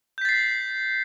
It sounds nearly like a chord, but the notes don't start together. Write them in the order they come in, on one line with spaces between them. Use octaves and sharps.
G6 B6 A6 C7